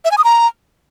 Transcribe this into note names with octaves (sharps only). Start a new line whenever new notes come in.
E5
G#5
D#6
A#5